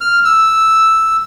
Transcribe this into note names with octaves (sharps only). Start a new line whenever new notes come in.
F6
E6